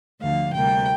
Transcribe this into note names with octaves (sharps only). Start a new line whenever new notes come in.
D2 D3 F3 F5
D2 C3 G3 A#3 G5